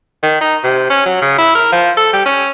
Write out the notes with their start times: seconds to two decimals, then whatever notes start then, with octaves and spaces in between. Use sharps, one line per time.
0.23 D#3
0.41 D#4
0.64 C3
0.90 C#4
1.06 F#3
1.22 C#3
1.39 E4
1.55 A#4
1.72 F3
1.97 A4
2.13 G3
2.26 C#4